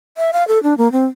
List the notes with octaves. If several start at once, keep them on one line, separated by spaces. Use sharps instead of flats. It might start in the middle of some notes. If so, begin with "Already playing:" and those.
E5
F5
A4
D4
A#3
C4